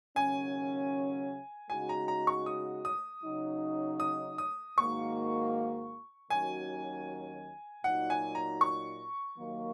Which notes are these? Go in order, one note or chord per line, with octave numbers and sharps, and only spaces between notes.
D#2 C#3 F#3 C#4 G#5
C#3 G#3 D#4 F#4 G#5
A#5
A#5
C#6
D#6
D#6
C#3 F#3 D#4
D#6
D#6
G#2 D#3 A#3 F#4 C#6
D#2 D#3 F#3 C#4 F#4 G#5
A#2 F#3 D#4 F#4 F#5
G#5
A#5
C#6
D#2 D#3 F#3 A#3